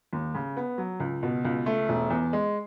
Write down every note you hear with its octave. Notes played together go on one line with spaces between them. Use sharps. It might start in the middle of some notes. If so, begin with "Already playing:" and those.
D#2
C#3
B3
F#3
C#2
B2
C#2
A3
E1
E2
G#3